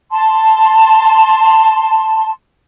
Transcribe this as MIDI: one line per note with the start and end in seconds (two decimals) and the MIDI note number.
0.11 2.29 81
0.11 2.29 84